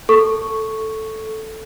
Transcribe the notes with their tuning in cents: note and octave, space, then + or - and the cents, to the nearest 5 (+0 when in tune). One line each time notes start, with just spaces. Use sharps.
A4 +0 C#6 +0